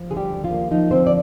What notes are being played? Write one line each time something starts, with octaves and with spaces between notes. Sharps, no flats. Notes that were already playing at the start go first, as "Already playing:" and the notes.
Already playing: F3
D3 G#4
G3 G4
D#2
F3 F4
A#3
F3 D#4
D3 C4 C5
D5